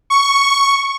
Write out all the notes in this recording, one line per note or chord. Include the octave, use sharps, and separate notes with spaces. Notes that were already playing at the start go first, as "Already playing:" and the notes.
C#6